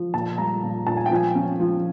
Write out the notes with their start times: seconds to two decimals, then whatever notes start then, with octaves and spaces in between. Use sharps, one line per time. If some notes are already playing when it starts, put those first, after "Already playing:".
Already playing: F3
0.14 A#2 A5
0.38 G3 A#5
0.63 A#2
0.87 A#2 A5
0.97 G#5
1.06 G5
1.11 F3 G#5
1.35 C#4
1.60 F3